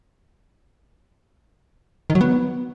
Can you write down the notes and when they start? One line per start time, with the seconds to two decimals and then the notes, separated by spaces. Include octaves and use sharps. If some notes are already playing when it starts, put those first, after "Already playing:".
2.10 D#3
2.15 F#3
2.21 B3